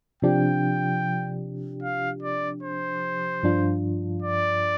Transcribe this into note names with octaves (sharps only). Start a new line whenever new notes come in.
C3 F3 D4 G4 G5
F5
D5
C5
G2 F3 D4 F4
D5